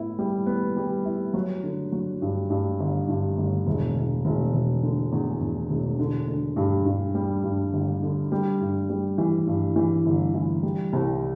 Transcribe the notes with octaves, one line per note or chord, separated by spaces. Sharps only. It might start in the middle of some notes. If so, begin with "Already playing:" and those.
Already playing: A2 B3 E4
G3
B3
G3
E4
F#3
D3
F#3
G2
G2
G1
G2
G1
E1
E1
E1
E1
D3
E2
E2
E1
D3
D3
G2
G2
G3
G2
G1
D3
G3
G2
G3
E3
G2
E3
G1
E3
G3
C2